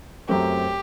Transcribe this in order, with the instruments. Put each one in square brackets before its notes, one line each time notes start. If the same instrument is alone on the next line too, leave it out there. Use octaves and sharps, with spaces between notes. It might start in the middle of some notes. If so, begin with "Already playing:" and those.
[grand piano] F#2 F#3 A3 C4 [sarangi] G4